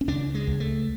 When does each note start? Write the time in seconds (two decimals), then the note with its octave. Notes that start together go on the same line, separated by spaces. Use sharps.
0.01 C#4
0.08 C#2 D4
0.34 G#3
0.47 C#2
0.60 A3